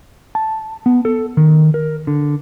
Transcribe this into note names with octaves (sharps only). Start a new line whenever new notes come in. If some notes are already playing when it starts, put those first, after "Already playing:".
A5
B3
A4
D#3
A#4
D3